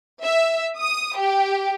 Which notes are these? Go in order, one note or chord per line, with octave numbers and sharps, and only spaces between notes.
E5
D#6
G4